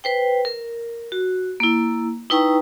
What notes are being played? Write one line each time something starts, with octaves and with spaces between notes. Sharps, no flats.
B4 C5 G5
A#4
F#4
A#3 E4
D#4 E4 B4 G5 A#5 C#6